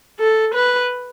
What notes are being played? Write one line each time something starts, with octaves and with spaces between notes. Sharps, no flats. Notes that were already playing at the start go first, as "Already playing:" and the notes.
A4
B4